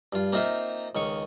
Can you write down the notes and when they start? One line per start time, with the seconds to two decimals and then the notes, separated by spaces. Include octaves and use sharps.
0.13 G2 F4
0.33 A#3 C4 D#4 F4 A#4 E5
0.95 C#2 D#3 C#6